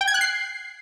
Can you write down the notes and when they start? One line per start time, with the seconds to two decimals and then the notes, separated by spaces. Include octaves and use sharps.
0.01 G5
0.07 G#6
0.14 F#6
0.21 C7